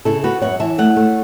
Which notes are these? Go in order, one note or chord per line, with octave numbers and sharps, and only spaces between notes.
C#3 E4 A4
B3 F#4 B4
F#2 C#5 F#5
E3 E5 A5
A3 C#5 F#5
A3